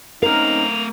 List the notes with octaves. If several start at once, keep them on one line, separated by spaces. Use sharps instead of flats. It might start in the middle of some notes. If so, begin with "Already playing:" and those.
A3 C4 C#4 D#4 A#4 F5 F7